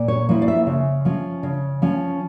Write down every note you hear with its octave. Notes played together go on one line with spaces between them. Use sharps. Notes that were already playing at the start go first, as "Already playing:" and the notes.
Already playing: A#2
C#5
F3 A#3 E4 C#5
D5
E5
C#3
F3 C#4
C#3
F3 C#4